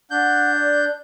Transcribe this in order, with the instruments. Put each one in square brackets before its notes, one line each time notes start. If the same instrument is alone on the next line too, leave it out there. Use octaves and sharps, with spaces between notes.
[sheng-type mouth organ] D4 G6 [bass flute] F#5
[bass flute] D5